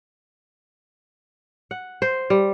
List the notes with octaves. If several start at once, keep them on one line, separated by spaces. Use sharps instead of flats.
F#5
C5
G3